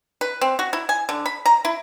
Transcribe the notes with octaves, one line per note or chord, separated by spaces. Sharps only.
B4
C4
F#4
E4
G#5
D3
B5
A#5
E4